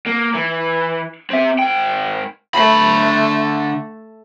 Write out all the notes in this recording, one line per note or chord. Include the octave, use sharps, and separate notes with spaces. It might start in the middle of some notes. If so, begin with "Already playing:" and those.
A#3
E3
C4 E5
G#2 G5
D3 A3 B5